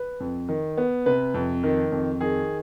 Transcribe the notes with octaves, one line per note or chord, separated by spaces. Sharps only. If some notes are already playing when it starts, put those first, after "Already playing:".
Already playing: B4
F2
D#3
B3
C3 B4
F2
D#3
F2
D#3 G#4